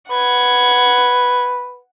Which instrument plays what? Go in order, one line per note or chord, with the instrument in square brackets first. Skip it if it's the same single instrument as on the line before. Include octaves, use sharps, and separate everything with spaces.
[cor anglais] B4 [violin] F#5 G#6